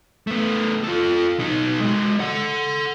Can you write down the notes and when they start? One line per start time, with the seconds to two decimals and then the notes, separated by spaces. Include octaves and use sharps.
0.27 A3 B3
0.84 F4 A4
1.39 B2 D#4
1.80 G#3 F#4
2.20 A4 F#5